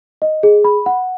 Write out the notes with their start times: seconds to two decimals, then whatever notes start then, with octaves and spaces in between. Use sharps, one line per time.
0.22 D#5
0.43 G#4
0.64 B5
0.86 F#5